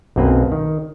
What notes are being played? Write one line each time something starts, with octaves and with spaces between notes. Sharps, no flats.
B1 F#2 A#3 C4 B4
D#3